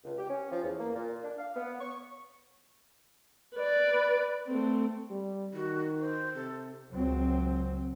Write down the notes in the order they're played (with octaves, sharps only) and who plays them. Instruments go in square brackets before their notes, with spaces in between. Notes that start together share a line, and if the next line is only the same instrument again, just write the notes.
[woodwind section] C#2
G4
C#4
F3
E2
A#3
A#2
D4
F5
B3
C#6
[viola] B4 D5
A3 C4
[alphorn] G3
[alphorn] D#3 [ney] F#4
[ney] C5
[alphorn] C3 [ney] A4
[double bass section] C#2 F#3 C4